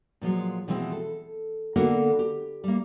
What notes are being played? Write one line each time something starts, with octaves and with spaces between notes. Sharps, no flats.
A#2 F3 F#3 G#3
B2 E3 F3 G#3 C4
A4
D3 A#3 B3 F#4 A4 A#4
G4
G3 A#3